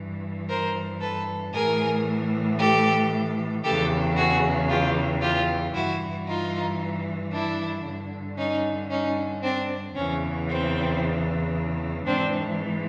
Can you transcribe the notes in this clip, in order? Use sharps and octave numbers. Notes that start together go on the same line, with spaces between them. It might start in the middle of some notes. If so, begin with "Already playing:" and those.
Already playing: G2 E3
A#4 C5
A4 B4
A2 E3 G#4 A#4
G4 A4
E2 C#3 E3 G4 A4
F#4 G#4
F4 G4
F4 G4
G2 E3 E4 F#4
D#4 F4
D4 E4
G2 D3
C#4 D#4
C#4 D#4
C4 D4
E2 C#3 E3 C#4
C4
G#2 E3 C4 D4